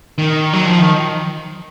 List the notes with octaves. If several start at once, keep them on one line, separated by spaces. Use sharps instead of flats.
D#3
F#3
F3
D#3